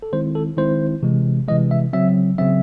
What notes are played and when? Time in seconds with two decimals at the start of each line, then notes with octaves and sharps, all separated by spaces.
0.02 A4
0.12 D#3 G#3 C4 E4 C5
0.35 A4
0.57 D#3 G#3 C4 E4 C5
1.03 C3 E3 G#3
1.48 C3 E3 G#3 D#5
1.71 E5
1.93 C#3 F#3 C4 E5
2.38 C#3 F#3 C4 E5